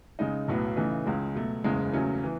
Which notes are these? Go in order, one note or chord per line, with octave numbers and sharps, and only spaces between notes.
C#3 G#3 D#4
B1 A2 F#3 B3
C#3 E3 A3 D#4
C#2 C#3 G#3
B2 F#3 A3
F#1 E2 C#3 G#3
E2 C#3 F#3 A3 C#4
E3 B3